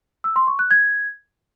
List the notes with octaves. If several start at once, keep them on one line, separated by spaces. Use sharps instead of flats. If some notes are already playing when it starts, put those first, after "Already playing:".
E6
C6
C#6
F#6
G#6